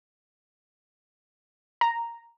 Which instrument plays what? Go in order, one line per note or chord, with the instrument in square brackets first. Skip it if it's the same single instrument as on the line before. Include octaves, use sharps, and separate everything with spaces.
[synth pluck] A#5